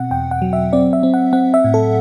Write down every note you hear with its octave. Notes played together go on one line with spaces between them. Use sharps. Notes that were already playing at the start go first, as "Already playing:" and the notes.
Already playing: B2 C4 F#5
E2 G5
F#5
F#3
E5
C4 D5
E5
C4
F#5
C4 F#5
E5
A2
A4